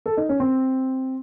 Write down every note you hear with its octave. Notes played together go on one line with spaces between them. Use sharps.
A4
D#4
C#4
C4